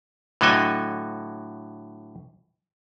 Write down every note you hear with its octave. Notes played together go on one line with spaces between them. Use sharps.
A2 D3 F#3 A4 D#5 G#5